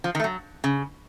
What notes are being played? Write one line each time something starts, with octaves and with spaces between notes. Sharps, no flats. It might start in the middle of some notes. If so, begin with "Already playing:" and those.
F3
D#3
A3
F#3
C#3